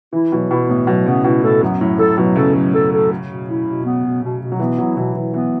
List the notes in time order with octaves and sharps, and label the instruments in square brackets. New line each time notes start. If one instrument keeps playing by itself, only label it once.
[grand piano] E3 [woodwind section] E4
[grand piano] B2 [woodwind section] F#3
[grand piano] B2 [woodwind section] E4
[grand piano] A2 [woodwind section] B3
[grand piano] B2 [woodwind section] F#3
[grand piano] C#3 [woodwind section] B3
[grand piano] B2 [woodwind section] E4
[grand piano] A2 [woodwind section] A4
[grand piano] F#2 [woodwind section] B3
[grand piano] A2 [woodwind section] F#3
[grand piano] A2 [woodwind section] A4
[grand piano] B2 [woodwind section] F#3
[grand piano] C#3 [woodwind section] A4
[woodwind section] F#3
A4
A4
B2
B2
E4
B2
B3
B2
B2
B2
[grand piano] F#3
[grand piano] E3 [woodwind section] B3
[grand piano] F#3 [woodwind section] E4
[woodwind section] B2 [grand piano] E3
[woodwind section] B2 [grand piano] E3
[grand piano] E3 [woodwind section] B3